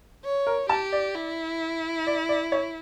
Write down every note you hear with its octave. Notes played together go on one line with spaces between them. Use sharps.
C#5
A#4
G4 A5
D5
E4
D5
D5
C#5